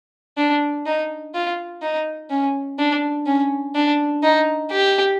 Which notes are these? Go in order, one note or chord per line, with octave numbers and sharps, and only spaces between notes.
D4
D#4
F4
D#4
C#4
D4
C#4
D4
D#4
G4